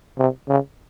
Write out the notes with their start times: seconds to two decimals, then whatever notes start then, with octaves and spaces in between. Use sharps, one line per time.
0.18 C3
0.49 C#3